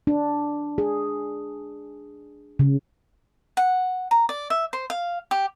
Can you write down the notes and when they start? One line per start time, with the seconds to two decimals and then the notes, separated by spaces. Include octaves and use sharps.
0.07 D4
0.78 G#4
2.59 C#3
3.57 F#5
4.11 A#5
4.29 D5
4.50 E5
4.73 C5
4.90 F5
5.31 G4